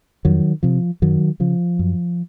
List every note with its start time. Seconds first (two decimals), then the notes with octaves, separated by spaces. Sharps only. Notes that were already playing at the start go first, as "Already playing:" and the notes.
0.25 F2 D#3 F#3
0.63 C3 F3
1.02 F#2 D#3 F#3
1.40 C#3 F3
1.79 F#2